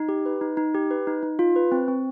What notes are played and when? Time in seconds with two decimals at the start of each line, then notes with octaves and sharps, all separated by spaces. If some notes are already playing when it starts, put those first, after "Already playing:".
Already playing: D#4
0.09 G4
0.26 B4
0.41 D#4
0.57 D#4
0.74 G4
0.91 B4
1.07 D#4
1.23 D#4
1.39 F4
1.56 B4
1.72 C4
1.88 C4